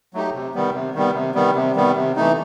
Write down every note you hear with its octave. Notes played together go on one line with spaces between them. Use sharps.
F#3 A3 D#4 G4
C3
D#3 G3 B3
C3
D#3 G3 B3
C3
D#3 G3 B3
C3
D#3 G3 B3
C3
E3 A3 D#4